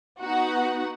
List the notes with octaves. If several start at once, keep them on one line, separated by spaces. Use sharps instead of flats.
B3 D#4 F#4 F#5